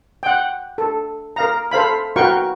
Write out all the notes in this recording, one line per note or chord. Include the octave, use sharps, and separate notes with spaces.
F#5 G5
A4
A#4 F5 A#5
A4 C5 F5 B5
F#4 A#4 B4 F5 G5 C#6